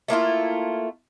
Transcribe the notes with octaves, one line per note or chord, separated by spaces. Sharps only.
A3 A#3 E4 F4